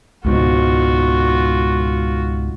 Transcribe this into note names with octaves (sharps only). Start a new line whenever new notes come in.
C#2 G#2 B2 F4 F#4